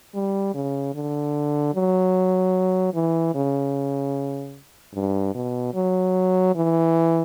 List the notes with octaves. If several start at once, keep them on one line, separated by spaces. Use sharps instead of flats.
G3
C#3
D3
F#3
E3
C#3
G2
B2
F#3
E3